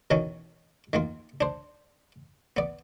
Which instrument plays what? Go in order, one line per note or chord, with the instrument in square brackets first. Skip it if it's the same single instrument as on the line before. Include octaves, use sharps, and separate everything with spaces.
[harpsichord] B2 D#3 E3 C#4
D#3 A#3 F4
D4 C5
B3 D5